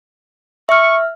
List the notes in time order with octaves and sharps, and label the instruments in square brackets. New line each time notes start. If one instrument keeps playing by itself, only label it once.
[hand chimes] E5 F6 [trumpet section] C#6